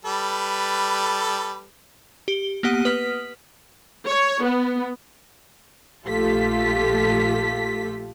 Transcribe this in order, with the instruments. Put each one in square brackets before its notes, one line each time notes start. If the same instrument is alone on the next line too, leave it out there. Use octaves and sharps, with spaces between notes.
[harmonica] G3 A4 B4
[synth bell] G4 G7
A#3 B3 G4 F#5 D#6 D#7
B4 D#6 F6 B6
[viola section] C#5
B3
[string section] A#1 A3 F4 G4 A4 B6